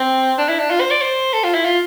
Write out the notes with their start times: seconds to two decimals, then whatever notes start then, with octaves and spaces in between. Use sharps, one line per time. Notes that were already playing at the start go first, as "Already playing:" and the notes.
Already playing: C4
0.38 D4
0.49 E4
0.59 D4
0.70 F4
0.80 C5
0.91 D5
1.02 C5
1.33 A4
1.44 F4
1.54 E4
1.65 F4